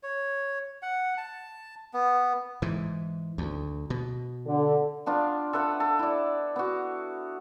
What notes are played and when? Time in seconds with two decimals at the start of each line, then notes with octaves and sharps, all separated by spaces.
0.03 C#5
0.82 F#5
1.18 A5
1.93 B3
2.62 G#2 E3
3.38 D2
3.90 B2
4.46 D3
5.06 B3 D4 F4
5.53 A4 B4 E5 F#5
5.80 A4
5.99 E4 D5
6.56 B3 F#4